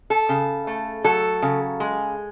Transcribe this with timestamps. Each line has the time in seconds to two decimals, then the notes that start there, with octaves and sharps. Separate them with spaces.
0.10 A4
0.29 C#3
0.67 A3
1.04 F#3 A4
1.42 C#3
1.80 G#3